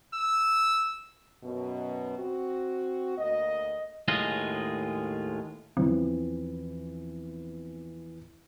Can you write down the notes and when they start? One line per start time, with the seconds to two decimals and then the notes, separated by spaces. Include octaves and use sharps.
0.15 E6
1.44 F#2 B2
2.18 C4 F#4
3.18 D2 A#3 D#5
4.08 D#2 A2 G#3 F4 G#4 D#5
5.77 E2 E3 F3 C4